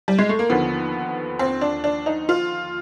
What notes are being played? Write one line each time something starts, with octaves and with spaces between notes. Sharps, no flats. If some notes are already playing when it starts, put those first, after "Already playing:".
G3
G#3
A3
A#3
D#2 D3 F3 B3
C4
D4
D4
D#4
F4